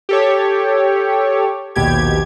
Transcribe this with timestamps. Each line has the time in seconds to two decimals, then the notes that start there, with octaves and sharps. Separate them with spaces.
0.09 G4 A4 C#5
1.75 A#1 D#2 B2 G4 G#6